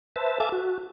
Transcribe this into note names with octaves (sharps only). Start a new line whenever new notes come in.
B4 C5 E5 A5
A4 E5 F5 G#5 A5 D6
F#4